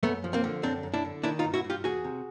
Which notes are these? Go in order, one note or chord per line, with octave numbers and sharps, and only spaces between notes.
F#2 A3 B3
F3
A#3 C4
D3
F#2 C4 D4
F#2
D4 E4
D3
D#3 D4 E4
D#4 F4
G2
E4 F#4
G2
F4 G4
E2 F#4 G#4
C3